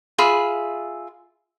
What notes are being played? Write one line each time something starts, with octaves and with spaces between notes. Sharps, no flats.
F4 G#4 E5 B5